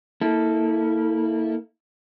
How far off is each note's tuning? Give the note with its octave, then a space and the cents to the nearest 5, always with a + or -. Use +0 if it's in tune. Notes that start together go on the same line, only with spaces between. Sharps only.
A#3 -15 E4 -30 A4 +0